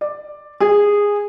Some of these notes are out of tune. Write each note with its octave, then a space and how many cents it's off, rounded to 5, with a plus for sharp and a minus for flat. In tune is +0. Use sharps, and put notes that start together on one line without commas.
D5 +10
G#4 -15